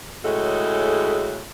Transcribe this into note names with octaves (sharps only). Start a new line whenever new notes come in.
A2 C#3 G#3 F#4 A4